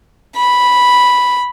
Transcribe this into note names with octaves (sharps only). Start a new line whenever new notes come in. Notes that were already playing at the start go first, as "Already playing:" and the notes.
B5